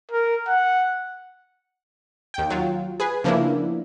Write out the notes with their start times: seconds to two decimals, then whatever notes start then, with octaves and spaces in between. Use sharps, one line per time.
0.11 A#4
0.48 F#5
2.34 D#2 G5
2.50 F#3 F4
3.00 G#4 B4 G#5
3.24 C#3 F3 A#3 B3 D4 E4